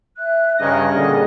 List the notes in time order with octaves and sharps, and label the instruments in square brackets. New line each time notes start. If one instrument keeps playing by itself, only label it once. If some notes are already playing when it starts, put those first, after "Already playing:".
[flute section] E5 F#6
[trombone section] G2 C#3 [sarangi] D#5 [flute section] A#5 F6 G#6
[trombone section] A#2 D3 G3 [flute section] G#4 D#6